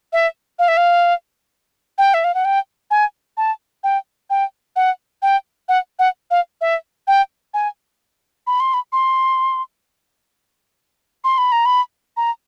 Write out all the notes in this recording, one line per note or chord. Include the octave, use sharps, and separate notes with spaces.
E5
F5
E5
F5
G5
E5
F5
F#5
G5
G#5
A5
G5
G5
F#5
G5
F#5
F#5
F5
E5
G5
G#5
B5
C6
B5
C6
C6
B5
A#5
B5
A#5